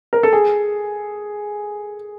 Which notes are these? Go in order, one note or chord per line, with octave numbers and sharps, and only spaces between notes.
A#4
A4
G#4